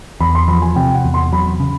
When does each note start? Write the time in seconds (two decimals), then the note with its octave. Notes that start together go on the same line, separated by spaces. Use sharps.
0.20 E2 B5
0.35 C6
0.48 F3 B5
0.62 G#5
0.76 C3 G5
0.95 F#5
1.05 E2
1.14 C6
1.32 F#3 B5
1.60 C#3